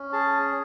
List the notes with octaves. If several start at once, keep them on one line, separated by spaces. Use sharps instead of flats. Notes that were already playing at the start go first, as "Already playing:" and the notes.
Already playing: C#4
G#4 A5